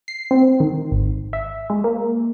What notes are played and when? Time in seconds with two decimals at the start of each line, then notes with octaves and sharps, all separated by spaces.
0.08 C7
0.31 C4
0.60 D#3
0.92 G#1
1.33 E5
1.70 G#3
1.84 A#3